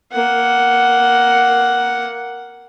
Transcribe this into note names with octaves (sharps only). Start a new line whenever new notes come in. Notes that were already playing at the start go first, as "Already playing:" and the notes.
A#3 F#5